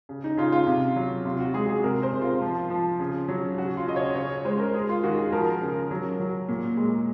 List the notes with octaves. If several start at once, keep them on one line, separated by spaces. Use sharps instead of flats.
C#3
D#4
C#3 F4
F4
C3
F#3
C3 F4
F#4
G#3 G#4
G#4
C3 A#4
C5
C3
F4
F3
F3
C#3
F#3
C#3 F#4
F4
C#3 D#5
C#5
C#3 C#5
G#3 C5
A#4
G#3 G#4
F4
D#3 F#4
G#4
F3 A#4
C#3
F#3
F#3
A#2
G#3